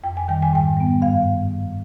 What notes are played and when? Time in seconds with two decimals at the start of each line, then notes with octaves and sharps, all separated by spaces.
0.04 F2 G5
0.17 G#5
0.28 D#3 G3 G5
0.42 G#5
0.53 G#2 G5
0.77 G3 B3
1.01 G2 F5